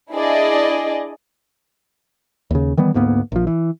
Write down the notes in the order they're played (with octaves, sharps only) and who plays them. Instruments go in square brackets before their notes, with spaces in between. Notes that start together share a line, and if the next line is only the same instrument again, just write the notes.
[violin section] D4 E4 G#4 D5 D#5
[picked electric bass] D#2 C#3
D#3 E3 G3 B3
D2 G#2 A#3 B3
A#1 F3
E3